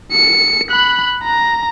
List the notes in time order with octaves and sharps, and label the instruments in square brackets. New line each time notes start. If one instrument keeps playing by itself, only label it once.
[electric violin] C#7
B5 F#6
A#5